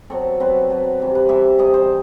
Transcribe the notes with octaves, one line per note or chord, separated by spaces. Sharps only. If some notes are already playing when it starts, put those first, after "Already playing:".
B2 F#3 C4 A4
B2 F#3 C4 B4
B2 F#3 C4
C3 E3 G3
B4
C3 E3 G3 E5
C3 E3 G3 D#5
C5